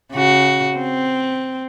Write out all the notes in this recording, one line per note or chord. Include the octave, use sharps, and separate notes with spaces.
C#3 F#4
C4